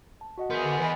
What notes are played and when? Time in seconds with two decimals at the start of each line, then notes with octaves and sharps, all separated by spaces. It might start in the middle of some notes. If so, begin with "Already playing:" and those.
0.21 A5
0.38 F#4 D#5 F#5
0.50 B3 G#4 A#4 C6 G6
0.64 D3
0.80 E3 B4 D#5